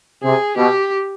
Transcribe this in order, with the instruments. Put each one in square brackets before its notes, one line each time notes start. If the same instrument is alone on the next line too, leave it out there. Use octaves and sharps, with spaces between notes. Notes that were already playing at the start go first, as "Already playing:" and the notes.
[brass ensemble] C3 [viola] G#4
[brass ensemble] B2 [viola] G4